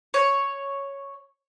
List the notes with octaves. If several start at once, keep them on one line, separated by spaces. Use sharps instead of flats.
C#5